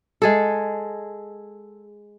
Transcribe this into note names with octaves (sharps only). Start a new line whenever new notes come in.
G#3 G#4 A4